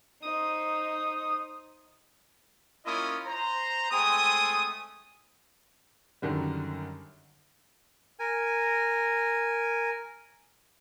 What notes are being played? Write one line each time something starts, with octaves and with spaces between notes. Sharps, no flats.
D#4 C5 D#6
A#3 C#4 E4 F4 D#5 D#6
C5 A#5
G#3 A3 C4 G#5 D#6
F#2 D3 D#3 G3
A#4 G#5